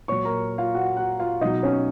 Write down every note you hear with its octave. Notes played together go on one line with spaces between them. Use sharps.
A#2 F#3 C#5 C#6
A#4 A#5
F4 F5
F#4 F#5
F#4 F#5
F4 F5
B2 F#3 D#4 D#5
C#4 C#5